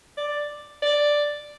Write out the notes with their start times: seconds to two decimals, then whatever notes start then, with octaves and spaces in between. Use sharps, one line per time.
0.17 D5
0.82 D5